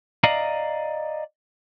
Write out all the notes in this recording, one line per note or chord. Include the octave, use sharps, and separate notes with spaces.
D5 D#5 F5 A#5